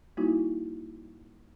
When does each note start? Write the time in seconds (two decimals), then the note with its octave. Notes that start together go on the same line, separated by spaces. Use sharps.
0.17 G3 A#3 D#4 E4 F#4